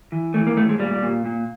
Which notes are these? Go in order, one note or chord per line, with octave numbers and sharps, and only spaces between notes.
E3
E3 A3
A#3
A2 A3
G#3
A#2 G3
A#2
A#2